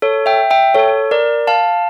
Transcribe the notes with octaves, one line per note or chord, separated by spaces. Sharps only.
A4 C#5
E5 G5
E5 G5
A4 C#5
A#4 D5
F5 A5